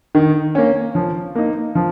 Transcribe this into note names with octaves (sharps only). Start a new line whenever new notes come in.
D#3
A#3 C#4
F3
A#3 D#4
F3